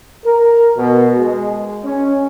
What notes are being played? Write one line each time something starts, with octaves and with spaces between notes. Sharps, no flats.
A#4
B2
G#3
C#4